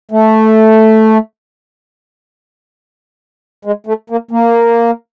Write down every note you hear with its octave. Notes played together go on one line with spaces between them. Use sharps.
A3
G#3
A3
A#3
A#3